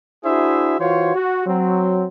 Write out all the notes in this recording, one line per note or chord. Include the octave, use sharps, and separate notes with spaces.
D4 E4 F#4 G#4 C5 E5
E3 F4 F#4 C5 C#5
F#4
F#3 C4